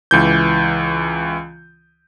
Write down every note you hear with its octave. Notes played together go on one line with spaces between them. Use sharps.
C#2 E3 G6